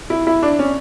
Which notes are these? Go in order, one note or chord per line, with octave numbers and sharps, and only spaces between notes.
E4
E4
D4
C#4